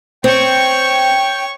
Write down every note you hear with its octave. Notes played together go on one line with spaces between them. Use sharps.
C4 C#5 G5 C#6